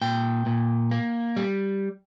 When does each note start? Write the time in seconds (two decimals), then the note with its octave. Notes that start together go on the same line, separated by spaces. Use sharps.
0.01 A#2 G5
0.46 A#2
0.91 A#3
1.36 G3